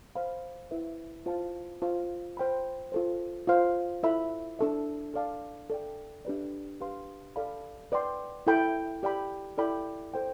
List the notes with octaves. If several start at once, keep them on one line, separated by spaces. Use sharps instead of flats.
C5 F5 B5
E4 B4 E5
F4 C5 F5 A5
F4 C5 F5
C5 G5 B5
F4 A4 C5
F4 C5 F5
E4 A4 E5 B5
D4 A4 E5
A4 D5 F5 A5
A4 D5 G5
D4 G4 B4 D5
G4 B4 F5 C6
A4 D5 F5 B5
B4 D5 G5 C6
E4 A4 E5 G5 B5
G4 D5 G5 B5
E4 A4 D5 G5 B5
A4 C5 G5